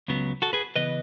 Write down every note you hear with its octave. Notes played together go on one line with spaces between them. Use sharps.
C#2 C#3 F#3 B3
F#4 A4
G#4 B4
C#3 E3 B3 B4 D#5